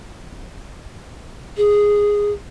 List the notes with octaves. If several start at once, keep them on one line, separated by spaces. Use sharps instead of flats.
G#4